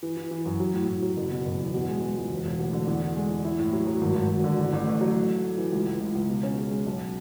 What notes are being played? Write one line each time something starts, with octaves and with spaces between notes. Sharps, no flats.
E3
E3
E3
F#2
F#3
A2
A2
F#3
F#1
B2
F#1
E2
B2
G#3
G#3
C#2
E1
E1
D2
D3
E2
E2
G#3
E2
E4
A2
F#3
F#3
G#1
G#1
G#1
D3
A1
A1
A3
F#3
A3
A3
A3
E3
C#2
C#2
C#2
C#2
B2
C#4
G#4
G#3
B1